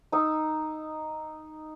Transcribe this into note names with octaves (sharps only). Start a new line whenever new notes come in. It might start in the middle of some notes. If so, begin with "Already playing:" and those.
D#4 D#6 E6